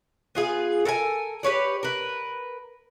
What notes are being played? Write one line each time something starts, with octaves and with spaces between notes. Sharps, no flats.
B3 F4 G#4
A4 A#4 F5 G#5
G4 B4 C#5 D5
A#4 B4